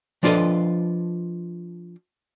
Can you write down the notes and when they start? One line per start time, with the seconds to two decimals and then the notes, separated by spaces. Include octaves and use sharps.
0.23 F3 D4 F4 A4 B4 D#5